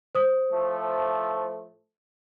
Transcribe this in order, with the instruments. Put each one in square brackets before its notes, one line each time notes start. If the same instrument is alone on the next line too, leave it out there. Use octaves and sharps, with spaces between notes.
[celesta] C5 D#6
[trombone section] A2 F3 A3